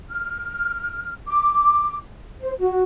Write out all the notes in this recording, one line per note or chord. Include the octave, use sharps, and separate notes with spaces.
F6
D6
C5
F#4